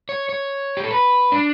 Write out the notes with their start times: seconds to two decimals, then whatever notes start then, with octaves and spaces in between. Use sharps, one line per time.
0.09 C#5
0.29 C#5
0.77 G4
0.84 A4
0.91 B4
1.32 D4